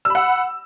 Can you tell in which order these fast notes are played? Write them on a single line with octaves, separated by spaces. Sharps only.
E6 B5 F#5